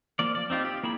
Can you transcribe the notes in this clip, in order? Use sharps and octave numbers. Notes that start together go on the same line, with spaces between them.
F3 A#3 D5
D5
C4 D#4 F4 G4
G4
A#3 E4 G#4 B5